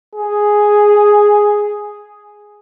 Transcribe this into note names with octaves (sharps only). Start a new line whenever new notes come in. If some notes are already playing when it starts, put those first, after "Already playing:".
G#4